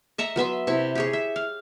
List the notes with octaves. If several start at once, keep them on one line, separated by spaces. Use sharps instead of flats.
D#5 E5 A#5 C#6
F#3 B3 E5 C6
C3 E4 C#6
G4 G#4 C#5
E5
F5